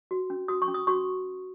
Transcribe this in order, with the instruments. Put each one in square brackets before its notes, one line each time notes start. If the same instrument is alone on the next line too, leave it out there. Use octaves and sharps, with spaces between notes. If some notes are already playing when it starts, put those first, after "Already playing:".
[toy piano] F#4
C#4
F#4 D#6
C#6
C#4
D#6
F#4 C#6